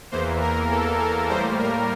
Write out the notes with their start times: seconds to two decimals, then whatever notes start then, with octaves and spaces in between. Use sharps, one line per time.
0.12 E2 E3 A#3 C5
0.41 A#4
0.71 A4
1.00 A#4
1.29 A2 G3 A#3 C5
1.59 A#4